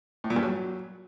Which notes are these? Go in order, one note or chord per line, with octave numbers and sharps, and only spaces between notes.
A2
A#2
G2
F#3